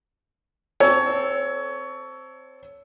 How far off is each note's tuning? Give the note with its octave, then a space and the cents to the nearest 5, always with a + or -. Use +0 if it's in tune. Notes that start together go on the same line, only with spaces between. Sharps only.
C4 +0 A4 +0 C#5 +20